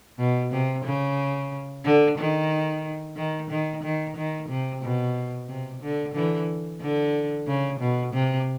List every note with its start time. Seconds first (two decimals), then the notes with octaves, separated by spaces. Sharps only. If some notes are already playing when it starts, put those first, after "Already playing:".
0.18 B2
0.52 C3
0.84 C#3
1.85 D3
2.18 D#3
3.16 D#3
3.50 D#3
3.83 D#3
4.16 D#3
4.49 C3
4.82 B2
5.48 C3
5.82 D3
6.14 D3 E3
6.81 D3
7.47 C#3
7.80 B2
8.13 C3